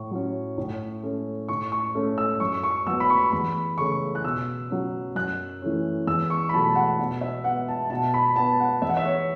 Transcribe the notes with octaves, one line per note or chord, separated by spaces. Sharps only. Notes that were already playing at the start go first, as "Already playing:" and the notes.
Already playing: A2 C#6
F#3 C#4
A2
A3 C#4
A2 C#6
C#6
A3 C#4
E6
F#2 C#6
C#6
F#3 B3 E6
B5
C#6
E2 B5
C#3 A3 C#4 C#6
F#6
B2 E6
F#3 C#4
F#2 F#6
E3 A3 C#4
E2 E6
C#6
B5
B2 F#3 A3 A5
F#5
B2 F#5
E5
B3 F#5
A5
B2 A5
B5
B3 A5
F#5
E2 E5
F#5
E5
C#5